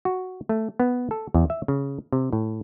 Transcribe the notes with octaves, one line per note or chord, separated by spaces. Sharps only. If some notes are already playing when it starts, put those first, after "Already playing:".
F#4
A3
B3
A4
E2
E5
C#3
C3
A2